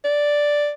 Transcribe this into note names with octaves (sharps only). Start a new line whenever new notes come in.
D5